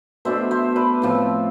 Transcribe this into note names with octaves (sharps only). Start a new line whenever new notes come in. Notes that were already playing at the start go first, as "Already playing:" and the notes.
B2 A3 D4 C5 E5
C5 E5
B4 D5
A2 F3 C4